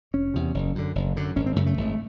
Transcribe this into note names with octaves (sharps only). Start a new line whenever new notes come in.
F1 C#4
E2 C3
F#1
F#2 D3
F#1
F#2 D3
G#1 C#4
C4
F#2 C#3 A3
A3
G#1